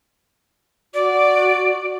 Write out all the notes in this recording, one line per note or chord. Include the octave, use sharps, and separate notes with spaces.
F#4 D5